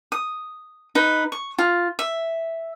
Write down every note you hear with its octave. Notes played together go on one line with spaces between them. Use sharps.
D#6
D#4 B4
C#6
F4
E5